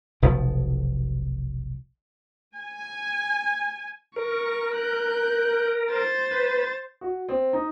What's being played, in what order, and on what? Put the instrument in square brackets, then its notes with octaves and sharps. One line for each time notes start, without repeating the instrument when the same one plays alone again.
[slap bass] F1 B1 B2 F3
[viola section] G#5
[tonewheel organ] A#4 [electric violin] C#6
[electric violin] F#6 G6
C5 A6
[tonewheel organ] B4
[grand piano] F#4
C4
D#4